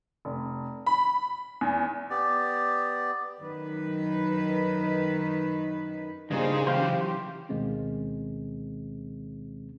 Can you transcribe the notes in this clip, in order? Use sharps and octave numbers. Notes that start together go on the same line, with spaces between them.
F1
B5
E2
B3 G4 D5
F#2 D#3 B4
G2 A#2 C#3 D#4 G#4 C5
E3 F#3 G4 C5 F5 G5
D2 B2 D#3 G#3 C4 C#4